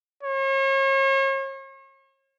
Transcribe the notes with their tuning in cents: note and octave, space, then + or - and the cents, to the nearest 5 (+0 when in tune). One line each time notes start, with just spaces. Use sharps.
C#5 -40